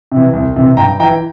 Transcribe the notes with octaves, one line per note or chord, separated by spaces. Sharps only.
C3 E3
C2
C3 E3
G2 G5 A#5
E3 G5 A#5